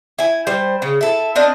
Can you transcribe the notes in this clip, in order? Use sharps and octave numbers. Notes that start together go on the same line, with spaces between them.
E4 G#5
G3 C5
C#3
E4 A4
C4 D4 D#5 F5